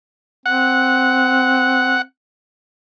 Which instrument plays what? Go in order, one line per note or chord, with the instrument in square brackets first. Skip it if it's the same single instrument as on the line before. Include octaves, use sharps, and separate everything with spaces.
[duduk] C4 [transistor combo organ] F#5